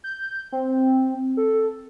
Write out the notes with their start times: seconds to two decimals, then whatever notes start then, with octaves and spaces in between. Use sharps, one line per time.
0.04 G6
0.52 C4
1.37 A4